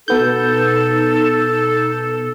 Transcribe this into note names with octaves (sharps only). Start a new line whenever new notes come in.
B2 B3 D#4 A4 G6